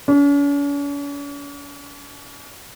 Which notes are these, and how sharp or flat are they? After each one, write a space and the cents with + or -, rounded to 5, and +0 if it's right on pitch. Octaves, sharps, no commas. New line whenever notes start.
C#4 +45